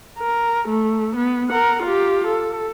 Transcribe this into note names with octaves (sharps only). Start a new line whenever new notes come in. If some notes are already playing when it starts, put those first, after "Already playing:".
A#4
A3
B3
A#4 F#5
F4 G4
A4